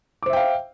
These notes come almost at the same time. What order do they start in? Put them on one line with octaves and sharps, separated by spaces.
D6 C5 E5 G5 F5